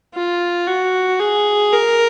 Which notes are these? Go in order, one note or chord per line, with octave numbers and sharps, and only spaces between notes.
F4
F#4
G#4
A#4